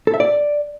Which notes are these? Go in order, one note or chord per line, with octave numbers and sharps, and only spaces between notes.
A4
E5
D5